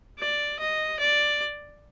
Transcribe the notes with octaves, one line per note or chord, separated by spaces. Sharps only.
D5
D#5
D5